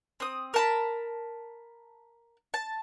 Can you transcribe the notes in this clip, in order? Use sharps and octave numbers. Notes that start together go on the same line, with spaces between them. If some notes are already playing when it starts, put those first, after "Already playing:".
C4 D#6
A#4 A5 B5
A5